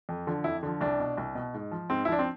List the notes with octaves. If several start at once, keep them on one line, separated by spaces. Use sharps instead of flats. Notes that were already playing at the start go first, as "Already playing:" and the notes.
F2
D3 F3
F2 E4
D3 F3
C2 D4
B2
C2
B2
G#2
F3
G#2 C4
E4
F3 D4
C4